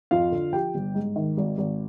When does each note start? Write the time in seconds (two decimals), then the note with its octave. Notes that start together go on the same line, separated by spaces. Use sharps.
0.11 F2 F4 F5
0.32 D3
0.53 F3 G4 G5
0.75 G1
0.95 G#2
1.16 D#3
1.37 G#1
1.58 G#1